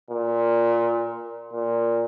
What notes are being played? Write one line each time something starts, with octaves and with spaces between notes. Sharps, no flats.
A#2
A#2